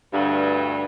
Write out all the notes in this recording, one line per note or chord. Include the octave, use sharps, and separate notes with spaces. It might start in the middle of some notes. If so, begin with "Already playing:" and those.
D2 G2